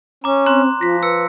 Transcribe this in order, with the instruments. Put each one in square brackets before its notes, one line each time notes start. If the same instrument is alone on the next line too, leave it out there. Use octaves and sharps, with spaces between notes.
[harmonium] C#4 [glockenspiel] A#5 D6
[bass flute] C4 [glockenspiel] A#5 C6 F#6
[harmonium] F3 [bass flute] F4 [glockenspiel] A#6 B6
[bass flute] B4 [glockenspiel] E6 C#7